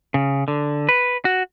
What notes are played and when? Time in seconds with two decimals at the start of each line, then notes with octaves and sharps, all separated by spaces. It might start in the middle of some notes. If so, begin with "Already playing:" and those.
0.14 C#3
0.48 D3
0.89 B4
1.25 F#4